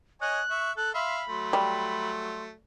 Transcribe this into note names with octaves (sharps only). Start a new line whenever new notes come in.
C#5 D#5 G#5 F#6
E5 C#6
A4 F#6
E5 F5 B5 C6
F#3 A3 C6
G3